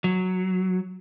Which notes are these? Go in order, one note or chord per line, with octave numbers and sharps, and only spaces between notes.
F#3